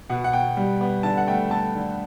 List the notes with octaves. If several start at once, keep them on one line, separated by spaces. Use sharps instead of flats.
B2 F#5
F#5
B2 G5
G3
B3
D3 A5
F#5
A3 G5
A3 A5
D3